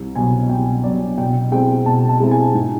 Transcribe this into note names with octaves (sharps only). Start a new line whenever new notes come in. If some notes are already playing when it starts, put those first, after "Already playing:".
Already playing: C2
B2 F#3 B3 G#5
C2 G5
B2 F#3 B3 D5
B2 G5
G#3 C4 E4 G5
B2 A5
A5
G#3 C4 E4
G#5
G#2